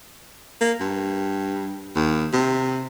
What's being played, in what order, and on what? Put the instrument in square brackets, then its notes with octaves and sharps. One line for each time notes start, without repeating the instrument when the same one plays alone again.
[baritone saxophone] A#3
G2
D#2
C3